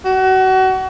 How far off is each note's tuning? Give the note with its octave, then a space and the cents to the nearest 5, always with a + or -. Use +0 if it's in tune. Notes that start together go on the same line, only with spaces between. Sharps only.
F#4 +30